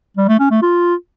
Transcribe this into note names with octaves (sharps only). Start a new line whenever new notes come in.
G3
A3
C#4
A3
F4